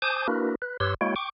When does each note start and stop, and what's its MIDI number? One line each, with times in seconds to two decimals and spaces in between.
0.02 0.27 72
0.02 0.27 80
0.02 0.27 81
0.02 0.27 86
0.02 0.27 87
0.02 0.27 91
0.28 0.55 58
0.28 0.55 62
0.28 0.55 64
0.28 0.55 66
0.28 0.55 70
0.28 0.55 71
0.62 0.77 71
0.80 0.94 43
0.80 0.94 67
0.80 0.94 71
0.80 0.94 73
0.80 0.94 84
0.80 0.94 88
1.01 1.15 56
1.01 1.15 58
1.01 1.15 64
1.01 1.15 66
1.01 1.15 73
1.01 1.15 79
1.16 1.29 79
1.16 1.29 85
1.16 1.29 86